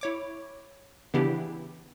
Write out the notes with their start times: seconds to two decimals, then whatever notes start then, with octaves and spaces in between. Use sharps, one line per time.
0.01 E4 C#5 D6
1.14 C#3 E3 B3 D4 E4 G4